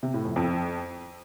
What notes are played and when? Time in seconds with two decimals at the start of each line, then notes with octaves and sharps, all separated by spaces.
0.03 C3
0.14 A2
0.25 F2
0.36 F2